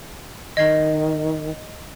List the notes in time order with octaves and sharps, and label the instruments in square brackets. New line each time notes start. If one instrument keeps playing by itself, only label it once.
[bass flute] D#3 [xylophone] D#5 G#6 C7